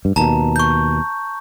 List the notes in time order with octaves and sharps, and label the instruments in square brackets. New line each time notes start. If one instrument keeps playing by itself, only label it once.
[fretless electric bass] G2
[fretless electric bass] D#2 B2 [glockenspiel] A5 A#5
[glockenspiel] C#6 G6